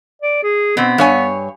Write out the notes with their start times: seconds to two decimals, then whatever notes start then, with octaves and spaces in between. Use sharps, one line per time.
0.22 D5
0.43 G#4
0.77 B2 B3 C4
0.98 G2 C#5 G#5